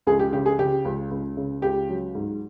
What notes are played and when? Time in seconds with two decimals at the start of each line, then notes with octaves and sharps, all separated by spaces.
0.07 C#2 G#4
0.19 G4
0.33 C#3 G4
0.46 G#4
0.59 C#3 G4
0.85 C#2
1.11 C#2
1.37 C#3
1.62 C#2 G4
1.89 F#3
2.15 G#2